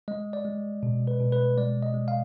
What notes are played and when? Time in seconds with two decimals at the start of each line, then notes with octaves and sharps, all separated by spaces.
0.08 G#3 D#5
0.33 D5
0.45 G#3
0.83 B2
1.07 B4
1.20 B2
1.32 B4
1.57 G#3 D5
1.82 D#5
1.94 G#3
2.08 F5